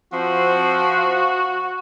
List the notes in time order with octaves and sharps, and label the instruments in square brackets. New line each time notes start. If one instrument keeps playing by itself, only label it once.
[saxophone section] F3 C4 [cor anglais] F#4